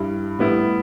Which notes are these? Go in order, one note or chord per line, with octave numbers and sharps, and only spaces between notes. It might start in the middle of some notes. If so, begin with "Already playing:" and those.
Already playing: G2 G3 E4
A2 G3 B3 E4